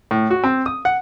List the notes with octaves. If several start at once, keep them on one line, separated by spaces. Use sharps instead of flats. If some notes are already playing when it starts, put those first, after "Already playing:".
A2
F#4
C4
D#6
F#5